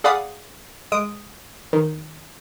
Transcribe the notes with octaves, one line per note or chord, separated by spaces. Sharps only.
G#4 D5 F5 F#5 B5 D#6
G#3 D#6 D7
D#3